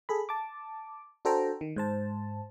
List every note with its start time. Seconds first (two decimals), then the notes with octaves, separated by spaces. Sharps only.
0.09 G#4 A4 B5
0.29 A5 D6
1.25 D4 F#4 A4 C5 G5 A#5
1.61 D#3
1.76 G#2 C5 A5